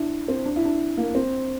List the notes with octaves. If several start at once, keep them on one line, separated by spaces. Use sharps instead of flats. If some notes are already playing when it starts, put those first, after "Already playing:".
Already playing: D4 E4
C4
D4
E4
D4
A#3
C4